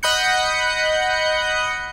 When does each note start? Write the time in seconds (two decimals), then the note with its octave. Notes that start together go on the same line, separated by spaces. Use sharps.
0.03 D#5 F#5 B5 F#6 G6 C#7